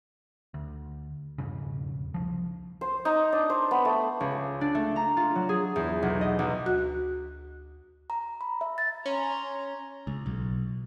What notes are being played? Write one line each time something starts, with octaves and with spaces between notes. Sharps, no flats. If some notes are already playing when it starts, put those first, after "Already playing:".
D2
E1 F2 G#2 C#3
C2 F3
C5
D#4
D4
C5
B3
A3
C#2
D4
A3
A#5
F4
F#3
G#4
E2
B1
D#5
B1
D2 F#4 F#6
A#5
B5
E5
A6
C#4 A#5 C6
C#2
B1